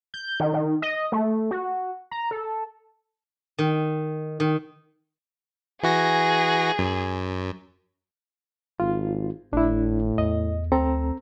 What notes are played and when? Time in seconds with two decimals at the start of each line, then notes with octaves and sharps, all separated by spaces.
0.14 G6
0.40 D#3
0.53 D#3
0.82 D#5
1.12 A3
1.51 F#4
2.11 A#5
2.31 A4
3.59 D#3
4.40 D#3
5.83 E3 F#4 G#4 A#6
6.79 F#2
8.80 G#1 F4
9.53 G#1 A2 D4 E4
10.18 E2 D#5
10.72 D2 C4 A4 A#5